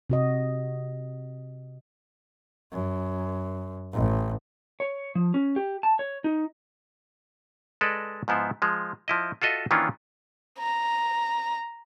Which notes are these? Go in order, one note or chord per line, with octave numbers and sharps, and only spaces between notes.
C3 F#4 D#5
F#2
A1
C#5
F3
C#4
G4
A5
C#5
D#4
G#3 A4 B4 D5 D#5
G#2 F3 B3 E4 C5
F3 G#3
F3 E4 D#5
F4 F#4 A4 D#5 E5
D#3 E3 A#3 C#4 D4 F4
A#5